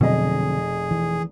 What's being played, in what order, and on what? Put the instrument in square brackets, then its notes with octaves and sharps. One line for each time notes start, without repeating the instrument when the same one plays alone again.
[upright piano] F1 D#5 [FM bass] B2 [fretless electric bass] D3 F#3 C4 [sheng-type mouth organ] G#4
[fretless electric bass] E3